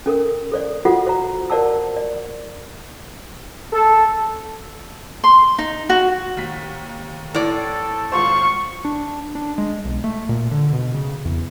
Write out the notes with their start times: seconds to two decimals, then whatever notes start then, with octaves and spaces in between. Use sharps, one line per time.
0.06 C#4 A4 A#4
0.52 A4 C5 D5
0.85 F4 F#4 A4 C5 F#5
1.07 C5 A#5
1.50 A#4 C5 D5 F#5 A5 E6
1.97 D5
3.73 A4
5.24 C6
5.58 D#4
5.89 F#4
6.37 D#2 B6
7.35 A2 A4 D5
8.12 G#1 F4 C5 C#6
8.85 D4
9.35 D4
9.58 G#3
9.85 B1
10.04 A3
10.29 A#2
10.51 D3
10.73 B2
10.94 C#3
11.25 E2